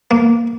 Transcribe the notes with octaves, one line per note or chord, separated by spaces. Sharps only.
A#3